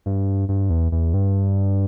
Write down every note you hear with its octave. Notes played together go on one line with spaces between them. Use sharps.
G2
G2
E2
E2
G2